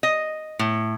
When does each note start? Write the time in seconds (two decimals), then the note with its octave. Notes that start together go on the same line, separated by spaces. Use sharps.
0.03 D#5
0.59 A2